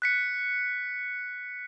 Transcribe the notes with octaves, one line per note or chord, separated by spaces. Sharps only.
F#6 B6 C#7